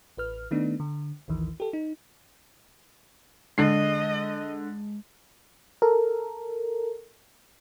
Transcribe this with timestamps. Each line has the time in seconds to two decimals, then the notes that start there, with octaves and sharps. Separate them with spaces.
0.17 A1 B4 F6
0.51 D#3 A3 B3 D4 D#4
0.80 D3
1.28 A1 D#2 D#3 E3
1.60 G4 A4
1.73 D#4
3.58 D3 G#3 D#5 C7
5.82 A4 A#4